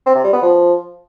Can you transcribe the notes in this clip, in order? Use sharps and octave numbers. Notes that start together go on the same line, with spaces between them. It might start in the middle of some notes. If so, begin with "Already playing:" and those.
C4
C3
G3
B3
F3